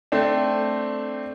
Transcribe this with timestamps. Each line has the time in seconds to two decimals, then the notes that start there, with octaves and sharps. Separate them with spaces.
0.12 A3 C4 D4